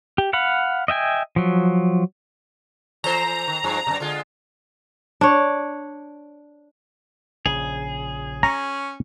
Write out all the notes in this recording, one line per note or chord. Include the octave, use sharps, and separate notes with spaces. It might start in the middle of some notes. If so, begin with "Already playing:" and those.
G4
F5 F#5 B5
D#5 E5 G5 G#5
F3 F#3
E3 A4 C5 A#5
D#3
G2 F3
F#2 B2
D3 G#3 F4
D4 C#5
A#1 C#3 G#4
C#4 A#5